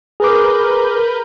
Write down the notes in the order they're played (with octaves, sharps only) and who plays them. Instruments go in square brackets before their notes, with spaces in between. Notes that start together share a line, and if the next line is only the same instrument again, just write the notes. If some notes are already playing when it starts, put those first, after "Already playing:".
[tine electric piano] G#4 D6 [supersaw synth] A#4 B4 G6